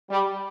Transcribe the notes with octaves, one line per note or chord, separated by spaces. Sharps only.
G3